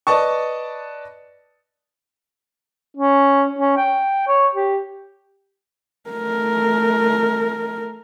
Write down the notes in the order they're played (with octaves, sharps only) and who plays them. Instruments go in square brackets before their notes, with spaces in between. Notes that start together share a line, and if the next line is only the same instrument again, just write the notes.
[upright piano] B4 D5 D#5 A5 C#6
[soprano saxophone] C#4
C#4
G5
C#5
G4
[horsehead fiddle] A3 A#4